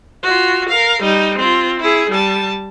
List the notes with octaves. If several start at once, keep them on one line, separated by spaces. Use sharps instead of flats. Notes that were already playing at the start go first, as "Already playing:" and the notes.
F4 F#4
A#4 F5
G3 D#4
C4 F4
E4 G#4
G3 A5